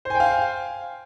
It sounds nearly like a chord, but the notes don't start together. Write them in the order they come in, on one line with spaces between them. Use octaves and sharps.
C5 G#5 G5 F5